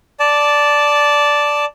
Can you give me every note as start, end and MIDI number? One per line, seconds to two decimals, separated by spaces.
0.20 1.65 74
0.20 1.65 81